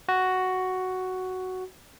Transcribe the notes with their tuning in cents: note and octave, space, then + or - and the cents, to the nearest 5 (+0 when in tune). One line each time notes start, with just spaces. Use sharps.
F#4 +5